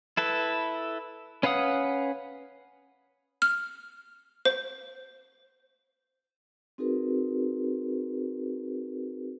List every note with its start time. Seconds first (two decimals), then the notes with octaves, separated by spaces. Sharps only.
0.17 E4 A4 B4
1.43 C#4 B4 F5 F#5 D#6
3.42 F6
4.45 C5
6.78 C4 D#4 F#4 G#4 A#4 B4